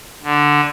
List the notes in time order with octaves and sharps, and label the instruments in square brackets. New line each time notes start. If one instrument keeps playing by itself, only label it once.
[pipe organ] D3